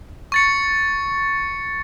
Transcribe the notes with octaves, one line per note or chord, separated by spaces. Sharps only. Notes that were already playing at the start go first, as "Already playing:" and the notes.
C#6 A6 C#7